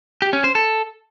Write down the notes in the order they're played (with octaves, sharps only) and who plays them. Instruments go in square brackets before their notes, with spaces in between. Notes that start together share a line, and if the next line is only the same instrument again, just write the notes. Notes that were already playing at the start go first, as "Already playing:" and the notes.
[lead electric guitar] G4
C#4
C5
A4